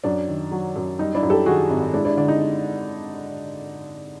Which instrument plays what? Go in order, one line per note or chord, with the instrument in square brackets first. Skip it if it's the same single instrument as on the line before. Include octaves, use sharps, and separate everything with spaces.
[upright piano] F#2 D4
D#3
F#3
F#2
G3 D#4
D4 E4
F#2
G4 A4
D#3 F#4 G#4
G#1
G#3 D4 E4
D4 E4
D3 D4
D#4